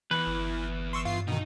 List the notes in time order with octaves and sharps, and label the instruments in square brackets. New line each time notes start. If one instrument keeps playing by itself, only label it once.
[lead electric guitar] E2 [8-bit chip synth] E3 [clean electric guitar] B4
[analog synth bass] G1
[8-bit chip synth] C6 C#6 E6
[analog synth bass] G2 [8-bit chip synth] F4 C7
[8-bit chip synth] B2 D#3 [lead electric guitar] D#4